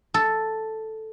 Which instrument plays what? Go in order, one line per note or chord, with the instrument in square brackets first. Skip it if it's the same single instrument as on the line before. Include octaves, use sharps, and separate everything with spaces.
[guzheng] A4